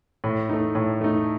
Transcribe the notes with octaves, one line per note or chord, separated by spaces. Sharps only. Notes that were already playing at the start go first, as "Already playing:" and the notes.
A2
A3 D#4
A2
A3 D#4